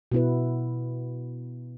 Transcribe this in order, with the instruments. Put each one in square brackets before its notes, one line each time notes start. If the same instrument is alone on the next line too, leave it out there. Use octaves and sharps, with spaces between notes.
[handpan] B2 B3 E4 B4